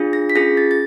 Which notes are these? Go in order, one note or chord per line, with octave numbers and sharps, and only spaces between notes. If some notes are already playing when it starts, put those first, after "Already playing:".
Already playing: D4 F4 G#4
A#6
B6
C#4 F4 G#4 A#6
A6
A6